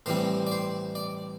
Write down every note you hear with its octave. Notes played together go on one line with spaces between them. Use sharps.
A2 E3 G3 C4 C5
D5
C5
D5